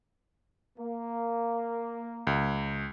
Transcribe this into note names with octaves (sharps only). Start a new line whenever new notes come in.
A#3
C#2